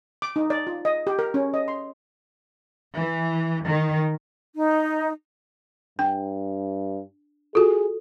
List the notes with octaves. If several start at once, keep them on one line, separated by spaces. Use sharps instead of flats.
D6
D#4
D5
F4
D#5
G4
A#4
C#4
D#5
C6
E3
D#3
D#4
G2 D4 G5
F4 F#4 G#4 A4